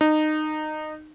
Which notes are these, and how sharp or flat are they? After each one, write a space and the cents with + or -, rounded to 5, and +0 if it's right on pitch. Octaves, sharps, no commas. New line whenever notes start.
D#4 -20